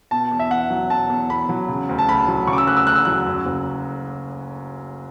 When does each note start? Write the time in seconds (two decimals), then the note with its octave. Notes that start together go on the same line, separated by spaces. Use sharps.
0.11 B2 A5
0.31 E2
0.39 E5
0.50 E2 F#5
0.70 F#3
0.90 B2 A5
1.10 E2
1.30 E2 B5
1.49 F#3
1.69 C#3
1.89 D2
1.99 A5
2.08 D2 B5
2.28 F#3
2.47 C#3 C#6
2.53 D6
2.58 E6
2.67 D2 F#6
2.77 E6
2.86 D2 F#6
2.95 E6
3.05 F#3 F#6
3.26 F#2
3.45 F#1